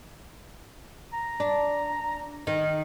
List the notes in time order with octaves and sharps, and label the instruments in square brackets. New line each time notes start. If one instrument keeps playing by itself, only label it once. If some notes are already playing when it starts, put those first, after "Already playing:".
[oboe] A#5
[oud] D4
D#3